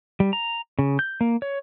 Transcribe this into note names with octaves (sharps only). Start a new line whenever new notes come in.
G3
A#5
C#3
G6
A#3
C#5